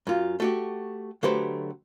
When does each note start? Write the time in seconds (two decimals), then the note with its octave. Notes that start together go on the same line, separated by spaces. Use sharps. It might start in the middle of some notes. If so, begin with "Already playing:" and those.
0.07 F#2 F4
0.40 A3 F#4 G4
1.23 D3 F#3 A3 G4 B4 C5